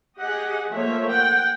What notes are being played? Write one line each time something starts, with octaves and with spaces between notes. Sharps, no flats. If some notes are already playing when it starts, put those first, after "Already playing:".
G4 G#4 D#5 F#5
F3 A3 A#3 C#5 E5
F#5 G5